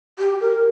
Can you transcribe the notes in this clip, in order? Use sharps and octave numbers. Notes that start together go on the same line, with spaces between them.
G4
A#4